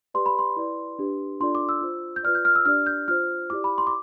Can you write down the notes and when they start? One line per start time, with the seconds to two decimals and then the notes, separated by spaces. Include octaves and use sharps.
0.14 G4 B4 D5 C6
0.26 B5
0.39 C6
0.57 E4 B4 D5
0.99 D4 G4 B4
1.40 D4 F4 A4 D5 C6
1.55 D6
1.69 E6
1.82 F4 C5
2.16 G6
2.23 F4 B4 D5 F6
2.35 G6
2.45 F6
2.55 E6
2.65 D4 G4 D5 F6
2.86 G6
3.08 F4 C5 F6
3.50 E4 G4 D5 D6
3.64 B5
3.78 C6
3.87 D6